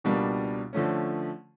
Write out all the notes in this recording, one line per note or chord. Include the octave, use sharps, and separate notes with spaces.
C#2 B2 G3 A#3 D4
D3 F3 A3 C#4